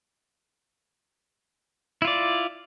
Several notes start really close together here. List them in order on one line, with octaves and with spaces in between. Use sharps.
E4 F4 D5